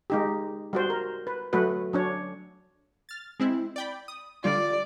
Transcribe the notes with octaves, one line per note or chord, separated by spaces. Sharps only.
G#3 D#4 G4
G3 F#4 C5
A#4
B4
F#3 A3 F#4 B4
F#3 D4 C#5
F6 A6
G#3 C4 E4
D5 G5 B5
D#6
D3 G3 F4 D5